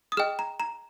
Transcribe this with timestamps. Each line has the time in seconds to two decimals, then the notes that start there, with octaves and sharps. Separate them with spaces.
0.12 D#6
0.17 G#4 D#5 G5 F6
0.39 A#5
0.60 A#5